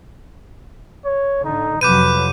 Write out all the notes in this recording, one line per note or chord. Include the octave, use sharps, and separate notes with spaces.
C#5
A2 D3 D#4
F2 C3 F#3 B4 D6 G6 D#7